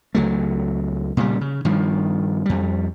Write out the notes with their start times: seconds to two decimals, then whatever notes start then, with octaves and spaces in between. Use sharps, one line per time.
0.15 C#2 F#3 A3
1.17 A#2 C#3 E3 G3
1.41 C#3
1.65 G2 D#3 F3
2.46 F2 G3